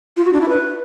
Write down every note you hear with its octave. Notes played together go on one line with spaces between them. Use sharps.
F4
F#4
D4
E4
B4